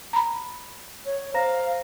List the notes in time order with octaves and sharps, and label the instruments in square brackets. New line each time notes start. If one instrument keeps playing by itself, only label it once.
[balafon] A#5 B5
[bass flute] C#5
[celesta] C5 A#5 A#6 [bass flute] F5